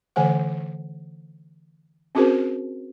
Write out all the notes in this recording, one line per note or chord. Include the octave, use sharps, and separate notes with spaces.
D3 E3 A3 C5 F#5
C4 C#4 F#4 G#4 A#4 C5